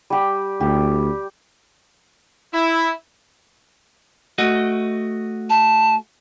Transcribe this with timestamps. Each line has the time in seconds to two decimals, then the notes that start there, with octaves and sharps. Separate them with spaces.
0.10 G3 G4
0.61 D2 G4
2.54 E4
4.38 A3 F#4 D#5
5.50 A5